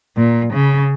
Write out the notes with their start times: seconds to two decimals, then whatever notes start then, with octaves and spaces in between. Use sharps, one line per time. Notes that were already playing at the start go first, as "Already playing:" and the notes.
0.16 A#2
0.52 C#3